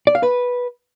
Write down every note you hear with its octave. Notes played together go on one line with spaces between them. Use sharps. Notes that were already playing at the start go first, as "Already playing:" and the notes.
D5
F5
B4